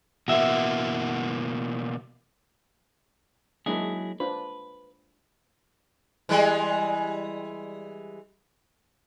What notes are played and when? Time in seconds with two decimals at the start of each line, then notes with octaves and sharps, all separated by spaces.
0.28 B2 E3 A#3 F#4 E5
3.66 F#3 G#3 A#3 D4 E4 G#4
4.20 D4 F4 B4 C5
6.29 E3 G3 G#3